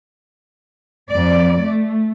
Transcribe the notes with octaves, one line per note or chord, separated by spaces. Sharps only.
F2 D5
A3